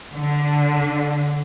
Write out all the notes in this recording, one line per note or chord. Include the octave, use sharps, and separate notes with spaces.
D3